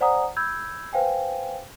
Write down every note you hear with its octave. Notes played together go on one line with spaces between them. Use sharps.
C5 D5 F#5 G#5 A#5 D#6
B5 E6 G6 G#6
B4 C5 F5 G5 G#5